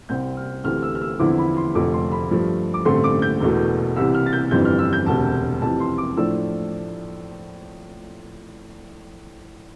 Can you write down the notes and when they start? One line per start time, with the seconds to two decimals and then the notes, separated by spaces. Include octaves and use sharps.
0.09 C2 C3 G3 C4 G6
0.37 F6
0.64 D2 C3 E3 A3 C4 F6
0.83 E6
0.95 F6
1.01 E6
1.19 E2 D3 F3 C4 E4 D6
1.38 B5
1.57 C6
1.75 F1 F2 D3 F3 A3 D6
1.93 C6
2.12 B5
2.31 G2 F3 A3
2.74 D6
2.85 A1 G2 D3 A3 C4 C6
3.04 D6
3.22 G6
3.40 E1 E2 B2 A3
3.96 C2 C3 E3 E6
4.15 F6
4.26 A6
4.33 G6
4.51 G1 F2 E3 G3 C4 G6
4.65 F6
4.79 E6
4.93 G6
5.06 E1 D2 C3 A5
5.62 F2 C3 E3 A5
5.80 C6
5.98 D6
6.17 A2 F3 A3 D4 E6